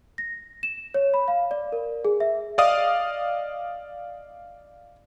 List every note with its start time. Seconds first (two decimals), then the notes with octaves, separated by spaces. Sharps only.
0.18 A#6
0.63 E7
0.94 C#5
1.14 B5
1.28 F5
1.51 D5
1.72 A#4
2.05 G#4
2.20 E5
2.58 D5 D#5 F5 D#6